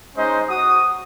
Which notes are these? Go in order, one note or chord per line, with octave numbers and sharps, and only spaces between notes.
G#3 C#4 D#4 C5 D#5
F#4 D#6